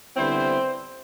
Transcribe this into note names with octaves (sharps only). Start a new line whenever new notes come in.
D3 G3 B3 C4 E4 C5